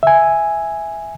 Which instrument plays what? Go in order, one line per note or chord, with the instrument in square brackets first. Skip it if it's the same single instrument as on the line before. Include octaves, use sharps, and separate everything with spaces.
[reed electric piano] E5 G#5